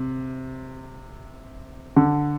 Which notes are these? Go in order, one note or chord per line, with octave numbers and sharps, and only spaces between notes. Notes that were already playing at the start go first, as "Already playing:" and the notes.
Already playing: C3
D3